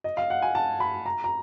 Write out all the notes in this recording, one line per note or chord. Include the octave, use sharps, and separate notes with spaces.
D#5
F5
F#5
G#5
A5
B5
A#5
A#5